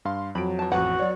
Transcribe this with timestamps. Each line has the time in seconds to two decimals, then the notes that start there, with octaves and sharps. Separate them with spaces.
0.05 G2 F5 C6
0.35 F2 F#3 B5 D7
0.59 E3 A5
0.72 A1 F2 B3 F#4 B4 F#5
1.00 F#3 C#5 D5